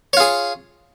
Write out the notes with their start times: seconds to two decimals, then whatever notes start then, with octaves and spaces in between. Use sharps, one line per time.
0.13 C#5
0.17 F4
0.20 G#4